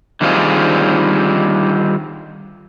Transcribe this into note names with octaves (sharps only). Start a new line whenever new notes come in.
D3 D#3 G3 C4 F4 G#4